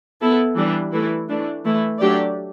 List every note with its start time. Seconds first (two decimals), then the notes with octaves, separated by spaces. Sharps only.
0.21 B3 E4 A4
0.57 E3 G3 D4
0.92 E3 A3 E4
1.29 E3 A3 D4
1.64 E3 A3 E4
2.00 F#3 A3 D4 G4 D5